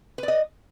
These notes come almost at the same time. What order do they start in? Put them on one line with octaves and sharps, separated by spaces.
B4 D5 D#5